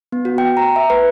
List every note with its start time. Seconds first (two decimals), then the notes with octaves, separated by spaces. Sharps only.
0.12 B3
0.25 F#4
0.38 G5
0.57 A#5
0.76 E5
0.90 B4